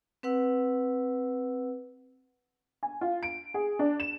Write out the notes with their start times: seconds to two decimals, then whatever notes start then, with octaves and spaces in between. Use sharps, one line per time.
0.23 C4 B4 F#5 E6
2.83 G#5
3.01 F4
3.23 D7
3.54 G#4
3.79 D4
4.00 E7